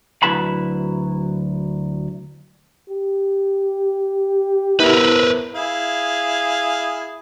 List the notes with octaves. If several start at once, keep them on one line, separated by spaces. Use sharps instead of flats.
D2 F#3 E4 B4 A5 B5
G4
B3 E4 A#4 B4
E4 G#4 F5